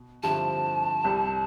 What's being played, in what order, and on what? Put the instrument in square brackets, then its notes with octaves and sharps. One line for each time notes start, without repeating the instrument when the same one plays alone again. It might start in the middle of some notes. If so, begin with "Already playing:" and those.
Already playing: [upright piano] B2
[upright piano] G2 D3 F3 C4 E4 [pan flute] A5
[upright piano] C2 C3 G3